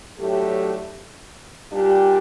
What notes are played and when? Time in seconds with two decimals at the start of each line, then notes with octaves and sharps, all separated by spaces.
0.19 A2 F#3 A3 D4 G4
1.72 A#2 G3 D4 G4